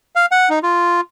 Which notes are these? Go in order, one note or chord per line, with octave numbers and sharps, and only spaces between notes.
F5
F#5
D#4
F4